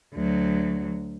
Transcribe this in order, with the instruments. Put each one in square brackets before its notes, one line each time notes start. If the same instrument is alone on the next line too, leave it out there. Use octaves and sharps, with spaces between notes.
[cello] D2 F#3